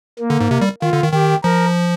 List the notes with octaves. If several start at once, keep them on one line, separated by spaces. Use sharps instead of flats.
A#3
D3
G#2
C3
G3
D#3 F4
D3
D#3
D#3 G4
F3 A#4